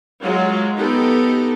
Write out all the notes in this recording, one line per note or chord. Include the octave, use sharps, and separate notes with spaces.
F#3 G#3 F4
B3 D#4 G4 A4